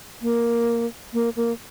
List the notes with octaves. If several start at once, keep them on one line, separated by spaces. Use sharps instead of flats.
A#3
A#3
A#3